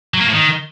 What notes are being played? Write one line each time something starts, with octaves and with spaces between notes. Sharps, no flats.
F#3
A#3
A2
D#3